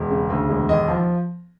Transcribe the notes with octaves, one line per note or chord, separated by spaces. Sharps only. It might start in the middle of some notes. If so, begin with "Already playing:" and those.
Already playing: E1
C#3
D2
E1
D#2 D#5
F3